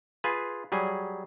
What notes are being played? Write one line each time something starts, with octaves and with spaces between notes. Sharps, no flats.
F4 G#4 B4
F#3 G3 G#4